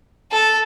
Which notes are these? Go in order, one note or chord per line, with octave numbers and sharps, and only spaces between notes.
A4